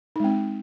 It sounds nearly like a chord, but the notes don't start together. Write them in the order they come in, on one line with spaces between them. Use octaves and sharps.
D#4 G#3 C4